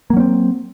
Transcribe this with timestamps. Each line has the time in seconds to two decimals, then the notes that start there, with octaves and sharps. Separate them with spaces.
0.10 A#3
0.13 F#3
0.17 C#4
0.20 C4